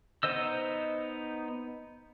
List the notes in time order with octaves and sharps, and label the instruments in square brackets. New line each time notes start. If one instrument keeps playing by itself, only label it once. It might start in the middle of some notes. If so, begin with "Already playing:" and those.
[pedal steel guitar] B3 D#4 C5 D#5 E6